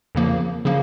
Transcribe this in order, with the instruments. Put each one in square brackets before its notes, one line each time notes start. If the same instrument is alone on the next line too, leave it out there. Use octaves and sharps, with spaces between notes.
[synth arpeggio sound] F2 C#3 F3 A#3
C#3 F3 A#3